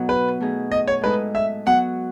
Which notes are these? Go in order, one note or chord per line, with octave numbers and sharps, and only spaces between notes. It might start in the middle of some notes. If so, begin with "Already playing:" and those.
Already playing: B2 F#3 B3 D#4 F#4 A4
B4
B2 A3 D#4 G#4
D#5
C#5
A2 G#3 D#4 A4 B4
E5
F#3 B3 F#4 F#5